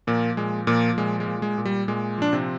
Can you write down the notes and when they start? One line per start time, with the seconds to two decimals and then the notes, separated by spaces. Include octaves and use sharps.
0.07 A#2 F3 A#3
0.37 A#2 G#3
0.67 A#2 F3 A#3
0.98 A#2 G#3
1.20 G#3
1.28 A#2
1.42 G#3
1.58 A#2
1.65 G3
1.88 A#2 G#3
2.18 F3 D4
2.33 C3 C4